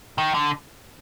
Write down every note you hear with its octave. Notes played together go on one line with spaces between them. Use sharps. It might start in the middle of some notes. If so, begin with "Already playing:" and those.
D#3
D3